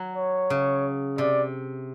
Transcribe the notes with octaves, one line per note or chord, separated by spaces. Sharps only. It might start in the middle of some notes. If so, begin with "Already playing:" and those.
Already playing: F#3
C#5
C#3
C3 D5